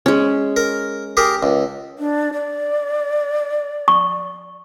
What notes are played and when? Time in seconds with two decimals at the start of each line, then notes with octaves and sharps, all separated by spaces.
0.06 G#3 C#4
0.56 A#4
1.17 G4 G#4 A#4
1.43 C#2
1.99 D4
2.33 D5
3.88 C#6